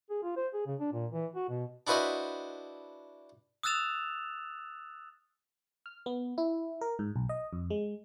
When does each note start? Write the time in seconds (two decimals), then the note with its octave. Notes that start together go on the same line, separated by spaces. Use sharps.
0.10 G#4
0.23 F4
0.37 C5
0.54 G#4
0.66 C#3
0.80 D4
0.93 A#2
1.12 E3
1.36 F#4
1.49 B2
1.87 D4 E4 F#4 B4 C5 D#5
3.63 D#6 E6 F#6 A6 E7 F7
5.86 F6
6.06 B3
6.38 E4
6.81 A#4
6.99 G#2
7.16 B1
7.29 D#5
7.53 F2
7.70 G#3